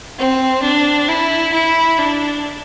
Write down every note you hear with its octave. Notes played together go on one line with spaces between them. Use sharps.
C4
D4
E4
E4
D4